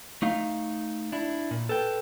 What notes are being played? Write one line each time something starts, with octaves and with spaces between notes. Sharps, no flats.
A3 D#4 F5
D4 E4
A#2
A4 B4 G5